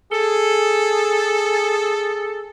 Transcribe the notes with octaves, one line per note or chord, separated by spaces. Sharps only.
G#4 A4